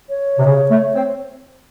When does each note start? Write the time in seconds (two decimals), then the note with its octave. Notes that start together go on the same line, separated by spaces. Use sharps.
0.09 C#5
0.38 C3
0.45 C#3
0.70 A3
0.95 C4